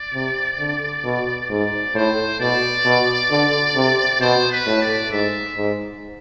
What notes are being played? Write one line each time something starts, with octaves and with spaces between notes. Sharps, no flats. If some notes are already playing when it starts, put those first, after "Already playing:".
Already playing: D5
C3
D3
B2
G#2 D5
A2 C5
B2 D5
B2
D3
C3
B2 C5
B4
A2
D5
G#2 E5
G#2